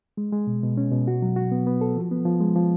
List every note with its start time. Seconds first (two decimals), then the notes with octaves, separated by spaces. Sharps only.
0.17 G#3
0.32 G#3
0.47 B2
0.63 B2
0.77 C#4
0.92 B2
1.08 F#4
1.22 F#3
1.36 F#4
1.52 B3
1.67 B3
1.81 A4
1.97 F3
2.11 B3
2.25 F3
2.41 G#3
2.56 F3